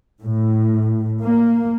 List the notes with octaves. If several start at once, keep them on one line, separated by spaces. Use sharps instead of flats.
A2
A#3